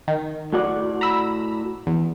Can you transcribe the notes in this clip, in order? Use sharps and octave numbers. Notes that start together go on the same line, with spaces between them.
D#3
A2 F#4 D5
A#5 B5 E6
E2